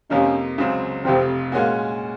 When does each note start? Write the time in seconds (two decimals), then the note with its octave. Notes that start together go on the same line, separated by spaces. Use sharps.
0.10 F2 C3 F3 A#3 C#4 D#4
0.58 C#2 C#3 F#3 C4
1.04 F1 F2 C3 F3 C4
1.52 A#2 G#3 A#3 C#4 F#4